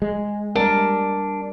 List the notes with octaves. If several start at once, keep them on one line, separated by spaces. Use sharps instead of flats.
G#3
G3 D4 A#4